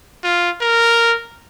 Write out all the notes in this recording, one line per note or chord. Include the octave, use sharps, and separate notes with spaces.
F4
A#4